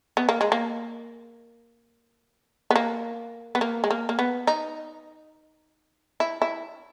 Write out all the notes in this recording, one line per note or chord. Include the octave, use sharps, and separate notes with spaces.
B3
A#3
G#3
A#3
B3
A#3
B3
A#3
G#3
A#3
A#3
B3
D#4
E4
E4